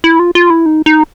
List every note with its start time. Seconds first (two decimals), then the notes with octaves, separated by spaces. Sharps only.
0.04 E4
0.20 F4
0.35 F4
0.50 E4
0.66 D#4
0.86 D#4